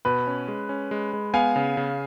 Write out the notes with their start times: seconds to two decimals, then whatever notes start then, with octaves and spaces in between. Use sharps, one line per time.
0.05 B2 B4
0.27 C#4
0.48 G#3
0.69 C#4
0.91 G#3
1.13 G#3
1.34 B3 F5 G#5
1.56 C#3
1.77 C#3